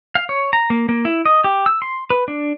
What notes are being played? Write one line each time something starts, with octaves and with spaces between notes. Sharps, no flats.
F5
C#5
A#5
A#3
A#3
E4
D#5
G4
E6
C6
B4
D4